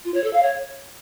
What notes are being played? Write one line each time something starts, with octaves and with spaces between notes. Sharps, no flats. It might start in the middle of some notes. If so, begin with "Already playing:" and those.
F4
C#5
A4
F5
C#5